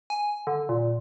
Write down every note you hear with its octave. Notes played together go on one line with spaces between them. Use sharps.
G#5
D3
A#2